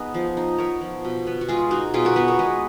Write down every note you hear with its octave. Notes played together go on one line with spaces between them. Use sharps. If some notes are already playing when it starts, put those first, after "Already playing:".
Already playing: B3 D#4 G#4 B4 D#5
F3
D#4
B3 A#4 C#5
F3
B2
B3
F#4
G#3 F4 G#4
D#4 F#4
B2 F4 G#4
F#4 A#4
B3 G#4 B4
A#4 C#5
G#3 B4 D#5